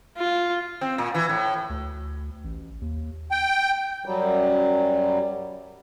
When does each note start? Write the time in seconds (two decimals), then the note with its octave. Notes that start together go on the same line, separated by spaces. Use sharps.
0.18 F4
0.81 C4
0.98 A#2
1.14 E3
1.29 A2
1.69 D2
2.44 A1
2.81 D#2
3.31 G5
4.06 F#2 F#3 G3